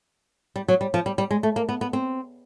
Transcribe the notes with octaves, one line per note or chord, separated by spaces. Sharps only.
G3
F#3
G3
F3
G3
G3
G#3
A3
A#3
B3
B3
C4